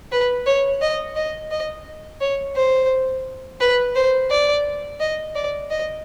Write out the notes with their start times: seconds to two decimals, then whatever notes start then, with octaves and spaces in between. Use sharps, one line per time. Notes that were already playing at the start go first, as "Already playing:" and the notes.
0.12 B4
0.46 C#5
0.82 D#5
1.16 D#5
1.51 D#5
2.21 C#5
2.56 C5
3.61 B4
3.95 C5
4.30 D5
5.00 D#5
5.35 D5
5.71 D#5